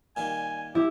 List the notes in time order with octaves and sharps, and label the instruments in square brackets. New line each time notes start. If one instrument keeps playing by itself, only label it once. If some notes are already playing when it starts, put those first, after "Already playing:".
[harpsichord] A#2 D#3 G3 [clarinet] G#5
[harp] E4 [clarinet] G4